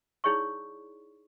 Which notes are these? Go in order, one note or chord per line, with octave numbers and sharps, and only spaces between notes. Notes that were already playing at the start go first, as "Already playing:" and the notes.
D#4 E4 G#4 C#5 D5 C#6